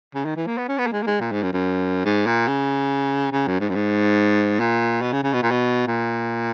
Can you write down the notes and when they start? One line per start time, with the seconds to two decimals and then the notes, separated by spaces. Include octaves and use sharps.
0.15 C#3
0.25 D#3
0.36 E3
0.47 A#3
0.58 B3
0.68 C#4
0.78 B3
0.87 A#3
0.92 G#3
1.02 A#3
1.07 G#3
1.20 A#2
1.32 G#2
1.43 F#2
1.53 F#2
2.05 G#2
2.26 A#2
2.48 C#3
3.32 C#3
3.47 F#2
3.60 G#2
3.69 F#2
3.75 G#2
4.60 A#2
5.02 B2
5.13 C#3
5.23 C#3
5.33 B2
5.42 A#2
5.51 B2
5.87 A#2